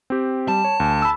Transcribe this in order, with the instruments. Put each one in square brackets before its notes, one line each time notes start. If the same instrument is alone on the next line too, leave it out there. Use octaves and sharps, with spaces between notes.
[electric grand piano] C4 G4
[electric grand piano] G3 [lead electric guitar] A5
[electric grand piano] C#5
D2
B5 E6